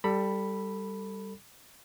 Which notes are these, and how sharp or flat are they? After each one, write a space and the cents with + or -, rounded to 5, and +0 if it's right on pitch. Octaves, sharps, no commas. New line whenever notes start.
G3 +0 A4 +20 B5 +0